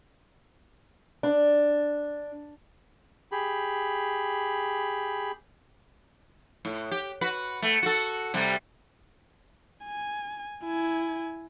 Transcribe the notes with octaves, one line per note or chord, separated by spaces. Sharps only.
D4
G4 G#4 B5
A2
G4
F#4 B4
A3
F#4 A4
C3 G3
G#5
E4 G#5